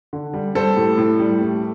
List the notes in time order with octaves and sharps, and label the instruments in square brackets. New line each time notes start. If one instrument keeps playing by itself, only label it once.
[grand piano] D3
G3
G3 A4 C5
A2
A2
G3
A3